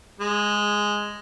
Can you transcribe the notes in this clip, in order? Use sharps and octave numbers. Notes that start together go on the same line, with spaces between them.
G#3